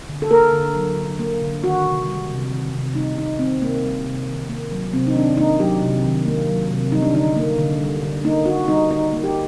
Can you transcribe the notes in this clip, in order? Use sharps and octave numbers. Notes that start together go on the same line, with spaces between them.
D3
A4
A#3 A#4
D3
F#3
D3
A#3
D3
D#3 F#4
C3
G3
C3
D#3
C3
G3 D#4
C3 D#4
D#3 C4
C3 A#3
G3
C3
D#3
A#3
F#3
C3 C4
D#4
D#3 D4
A#3 D#4
F#3 G4
C3
D#3
A#3
F#3
C3
G3 D#4
D4
D3 D#4
A#3
D3
G3
D3
A#3 D#4
D3 F#4
G3 D#4
D3 D#4
A#3
G4